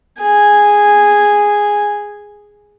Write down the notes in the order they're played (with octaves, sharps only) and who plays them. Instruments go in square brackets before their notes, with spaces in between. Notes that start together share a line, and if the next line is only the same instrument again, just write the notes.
[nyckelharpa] G#4 G#5